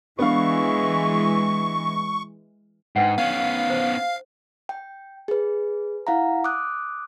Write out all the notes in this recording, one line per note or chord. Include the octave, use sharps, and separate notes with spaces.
E3 G#3 B3 D4 F5 C#6
G#2 D4 B4 F#5
B3 C#4 F5
C5
G5
G#4 B4
E4 F5 F#5 A#5
D6 D#6 F#6